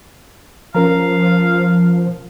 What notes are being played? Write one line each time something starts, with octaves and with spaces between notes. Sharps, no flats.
F3 C#4 A#4 F5 A#5